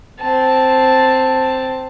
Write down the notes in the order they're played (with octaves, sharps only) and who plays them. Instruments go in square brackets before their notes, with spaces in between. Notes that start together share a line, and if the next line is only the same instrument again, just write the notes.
[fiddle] C4 A5